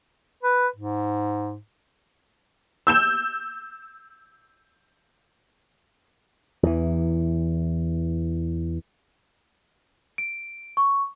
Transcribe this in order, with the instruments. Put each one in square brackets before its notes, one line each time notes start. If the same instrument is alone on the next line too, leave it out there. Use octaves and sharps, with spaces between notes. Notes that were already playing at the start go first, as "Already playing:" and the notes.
[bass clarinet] B4
G#2
[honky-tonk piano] E6 G6 E7
[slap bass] E2 E3
[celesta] D7
C#6